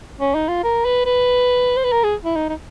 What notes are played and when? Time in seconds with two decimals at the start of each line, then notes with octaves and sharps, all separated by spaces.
0.20 C#4
0.35 D#4
0.48 F4
0.64 A#4
0.85 B4
1.06 B4
1.77 C5
1.84 B4
1.92 A#4
2.04 G#4
2.24 E4
2.35 D#4
2.49 D#4